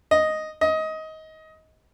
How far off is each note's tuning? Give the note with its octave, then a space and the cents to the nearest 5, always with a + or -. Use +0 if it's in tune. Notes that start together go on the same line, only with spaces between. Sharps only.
D#5 +0
D#5 +20